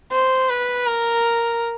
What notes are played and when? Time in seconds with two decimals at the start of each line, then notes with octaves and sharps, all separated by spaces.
0.12 C5
0.49 B4
0.87 A#4